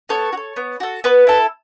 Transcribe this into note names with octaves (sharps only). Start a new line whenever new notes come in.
B3 A4 C#5
F#4
A4
B3
F#4 A4
B3 B4
E4 A4